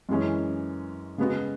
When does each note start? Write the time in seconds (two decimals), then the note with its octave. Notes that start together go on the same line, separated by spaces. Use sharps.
0.09 F#2 E3 G#3 C#4
1.18 C#3 G#3 B3 F#4